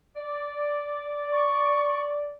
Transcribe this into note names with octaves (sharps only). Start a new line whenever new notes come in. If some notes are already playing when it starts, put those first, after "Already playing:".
D5
C#6